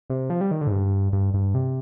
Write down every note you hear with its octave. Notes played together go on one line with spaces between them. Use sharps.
C3
F3
G3
D#3
D3
G#2
G2
G2
G2
C3